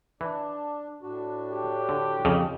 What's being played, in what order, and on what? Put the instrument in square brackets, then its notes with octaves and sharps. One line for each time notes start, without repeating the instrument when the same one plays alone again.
[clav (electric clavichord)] E3 [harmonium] D4
[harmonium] A2 D4 F#4
[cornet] G4
[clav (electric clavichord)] D3
[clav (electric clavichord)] F2 C#3 [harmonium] D#5